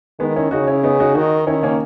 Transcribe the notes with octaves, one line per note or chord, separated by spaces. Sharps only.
D#3 G#3 B3
C#4 E4
C#3 D#4 F#4
C#4 E4
B3 D#4
D#4 F#4
D#3 D#4 F#4
D#3 C#4 E4
A#3 C#4